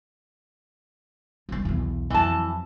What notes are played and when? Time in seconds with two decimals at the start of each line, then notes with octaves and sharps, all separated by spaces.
1.49 D#3 G3
1.65 B1 E2
2.10 F2 E3 F#3 A5